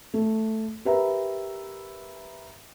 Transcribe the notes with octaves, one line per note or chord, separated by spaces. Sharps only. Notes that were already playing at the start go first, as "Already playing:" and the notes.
A3
G4 A#4 B4 E5 A#5